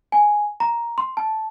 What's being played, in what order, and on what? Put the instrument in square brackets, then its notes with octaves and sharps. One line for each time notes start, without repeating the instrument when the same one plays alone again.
[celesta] G#5
A#5
C6
A5